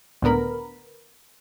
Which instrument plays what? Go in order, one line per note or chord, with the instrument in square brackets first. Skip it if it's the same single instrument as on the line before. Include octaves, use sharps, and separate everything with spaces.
[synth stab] C#2 A2 D3 B3 A#4 B5